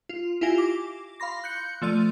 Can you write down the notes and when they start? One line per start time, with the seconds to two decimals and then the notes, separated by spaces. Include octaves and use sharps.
0.09 F4
0.41 E4 F4 G4 G#5 A#6
0.58 D6
1.20 F5 B5 C6 A#6
1.44 F#6 G6 C#7
1.82 F3 A3 D5 F6 D#7